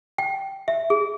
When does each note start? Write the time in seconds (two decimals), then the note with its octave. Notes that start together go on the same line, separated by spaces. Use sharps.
0.18 G5
0.68 E5
0.90 G#4